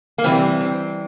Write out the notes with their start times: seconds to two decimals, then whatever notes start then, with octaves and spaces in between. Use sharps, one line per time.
0.18 A#3
0.24 C3 E3 G3 C4
0.61 C4